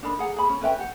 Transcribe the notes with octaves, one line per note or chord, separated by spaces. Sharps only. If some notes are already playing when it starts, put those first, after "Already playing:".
D4 D#4 A#4 B5
G#4 F#5 A#5
G#4 B5
C#4
C#4 B4 E5 G5
G4 F#5